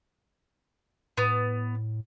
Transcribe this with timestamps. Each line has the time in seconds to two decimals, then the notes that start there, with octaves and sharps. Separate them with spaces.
1.17 A2 B3